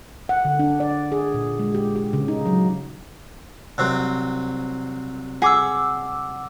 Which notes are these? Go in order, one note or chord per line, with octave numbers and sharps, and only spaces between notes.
F#5
D3
D4
D5
G#4
A#2
G#3
G4
G4
C#3
D#4
F#3
C2 F#3 C4
G#4 F#5 D6 E6